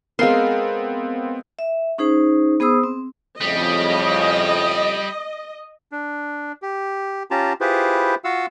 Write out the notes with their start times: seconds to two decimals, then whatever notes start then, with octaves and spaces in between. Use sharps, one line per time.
0.19 G#3 B3 C4 A#4 F5 C6
1.59 E5
1.98 C#4 D#4 G#4 C5
2.60 B3 G#4 C5 D#6 E6
2.83 C4
3.41 F2 A2 C#3 G3 D#5
5.92 D4
6.62 G4
7.31 C#4 F4 G4 A5 A#5
7.61 E4 F4 G4 G#4 B4 C5
8.24 F4 F#4 F5 F#5 E6